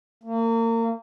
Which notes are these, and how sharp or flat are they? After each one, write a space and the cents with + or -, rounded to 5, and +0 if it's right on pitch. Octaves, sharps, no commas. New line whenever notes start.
A#3 -35